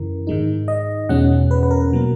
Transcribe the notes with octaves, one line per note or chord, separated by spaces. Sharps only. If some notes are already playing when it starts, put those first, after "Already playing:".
Already playing: F#2 C#3 E3 A#4
G#2 D#3 G#3 D#4
D#5
E2 B2 G#3 C#4 F#5
B4
B4
A#4
B2 F#3 A#3